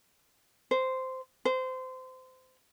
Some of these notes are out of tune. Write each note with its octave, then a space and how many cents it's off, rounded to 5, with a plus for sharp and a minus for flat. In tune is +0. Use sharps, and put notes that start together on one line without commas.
C5 -10
C5 -25